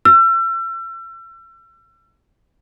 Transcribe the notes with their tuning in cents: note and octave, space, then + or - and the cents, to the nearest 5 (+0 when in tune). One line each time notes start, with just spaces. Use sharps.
E6 +40